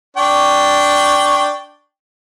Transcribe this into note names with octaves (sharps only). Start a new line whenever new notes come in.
D4 G5 C#6